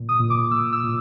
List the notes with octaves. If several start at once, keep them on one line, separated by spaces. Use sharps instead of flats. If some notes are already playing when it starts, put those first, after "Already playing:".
Already playing: A#2
D#6
A#2
D6
A#2 E6
E6
A#2